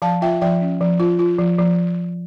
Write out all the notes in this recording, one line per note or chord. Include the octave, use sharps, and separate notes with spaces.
F3 F5 A5
F4 E5 G5
F3 E5 G5
C#4
F3
F4
F4
F3
F3